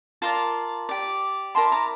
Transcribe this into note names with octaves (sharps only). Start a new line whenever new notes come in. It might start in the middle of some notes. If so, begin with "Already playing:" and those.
F4 A#4 D5 A5 C6
G4 D5
E4 A#4 D5 A5 C6
A#5 D6